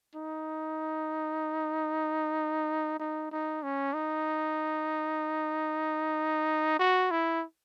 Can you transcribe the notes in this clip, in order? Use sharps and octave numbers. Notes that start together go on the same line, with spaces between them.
D#4
D#4
D#4
C#4
D#4
F#4
E4